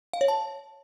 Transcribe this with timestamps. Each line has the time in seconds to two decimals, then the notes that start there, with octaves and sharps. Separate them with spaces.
0.13 F5
0.21 C#5
0.28 A5